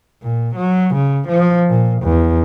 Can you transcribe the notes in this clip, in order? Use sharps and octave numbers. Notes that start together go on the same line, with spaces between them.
A#2
F#3
C#3
F3
A#2
E2